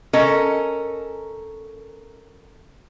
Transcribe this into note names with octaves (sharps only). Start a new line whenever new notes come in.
C#4 A4 A#4 D#5